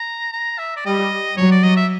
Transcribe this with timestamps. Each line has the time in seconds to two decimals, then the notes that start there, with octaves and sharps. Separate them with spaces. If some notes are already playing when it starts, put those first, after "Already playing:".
Already playing: A#5
0.33 A#5
0.59 E5
0.77 D5
0.86 G3 D#5
1.37 F#3 C#5
1.51 D5
1.63 D#5
1.77 E5